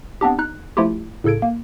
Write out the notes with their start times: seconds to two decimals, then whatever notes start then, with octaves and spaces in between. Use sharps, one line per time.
0.21 B3 C4 D4 G4
0.39 D#4 F#6
0.77 F3 A3 E4 F4 G4
1.24 A2 C#3 A4 G#6 D7
1.42 A#3